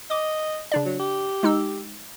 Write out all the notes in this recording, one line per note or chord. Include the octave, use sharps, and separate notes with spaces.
D#5 D6
C#3 D4 D5
F#3
G4
G#3 D#4 E6